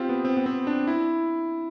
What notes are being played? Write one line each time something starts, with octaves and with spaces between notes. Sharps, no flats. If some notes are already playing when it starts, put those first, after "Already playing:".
Already playing: C4 F4 G4
B3
C4
B3
C4
D4
E4